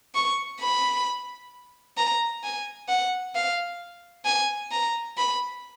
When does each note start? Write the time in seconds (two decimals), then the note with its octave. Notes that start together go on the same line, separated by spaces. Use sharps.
0.15 C#6
0.60 B5
1.97 A#5
2.43 G#5
2.89 F#5
3.35 F5
4.25 G#5
4.71 A#5
5.18 B5